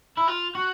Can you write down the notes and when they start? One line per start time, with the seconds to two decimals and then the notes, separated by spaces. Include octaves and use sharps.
0.17 E4
0.27 F4
0.55 F#4